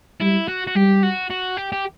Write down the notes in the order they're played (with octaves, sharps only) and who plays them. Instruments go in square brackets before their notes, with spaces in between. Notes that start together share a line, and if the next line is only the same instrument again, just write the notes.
[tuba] G3 [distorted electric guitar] E4
[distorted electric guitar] F#4
F#4
[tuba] G3 [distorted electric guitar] G4
[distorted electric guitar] F#4
F#4
G4
G4